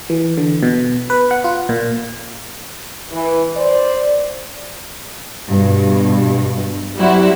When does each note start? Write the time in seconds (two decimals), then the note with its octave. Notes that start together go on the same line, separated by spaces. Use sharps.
0.10 E3
0.38 D3
0.63 B2
1.10 B4
1.31 F#5
1.44 F4
1.69 A#2
3.12 E3
3.57 C5 D5
5.50 G2 B2
6.97 F#3 G3 C4 E4 F#4